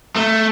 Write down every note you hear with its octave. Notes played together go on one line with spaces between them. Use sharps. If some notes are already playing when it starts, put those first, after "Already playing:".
A3